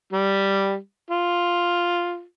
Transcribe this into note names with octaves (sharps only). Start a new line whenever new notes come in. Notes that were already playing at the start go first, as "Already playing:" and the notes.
G3
F4